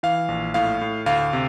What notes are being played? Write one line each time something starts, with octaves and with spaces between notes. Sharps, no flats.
E3 F5
A#1
A2 F5
A2
D2 F5
C3